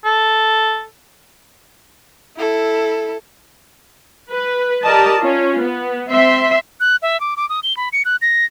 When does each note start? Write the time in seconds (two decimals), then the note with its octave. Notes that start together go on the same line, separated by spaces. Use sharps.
0.05 A4
2.37 E4 A4
4.30 B4
4.83 G4 A#4 D5 D#5 A5
5.19 C#4 F4
5.61 B3
6.11 C4 E5 C6
6.80 F#6
7.02 E5
7.20 D6
7.37 D6
7.49 D#6
7.63 G7
7.77 B5
7.92 C#7
8.05 F#6
8.21 A#6